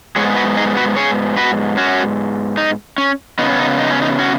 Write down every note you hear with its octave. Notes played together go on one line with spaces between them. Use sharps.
G#2 G#3 B3 G#4 C#5
F#4 B4
D#4 G#4
F#4 B4
G#4 C#5
F#4 B4
C#4 F#4
D#4
C#4
C#3 B3 D#4
C#4
D#4
D#4
C#4
D#4
C#4 F#4